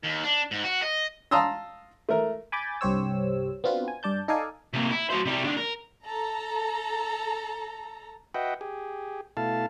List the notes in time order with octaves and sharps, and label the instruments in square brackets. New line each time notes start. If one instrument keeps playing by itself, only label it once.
[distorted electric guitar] D#2
D4
G#2
F#4
D#5
[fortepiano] F5 A5 A#5 C6 D#6 E6
A3 A#4
[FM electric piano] G#5 B5 D6 G6 A6
C2 G2 G4 C5 C#5 E6
B3 C4 D4 F4 F#4 B4
G#5
G2 D5 A5 G6
D#4 A4 D5 F5 G#5
[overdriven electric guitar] C3 A#3
E4
F#3 C5
C3 G3
D#3 D4
A#4
[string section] A4 A#5
[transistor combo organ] F#4 B4 D#5 E5 F#5 G5
G4 G#4
B2 A3 E4 A4 F5 A5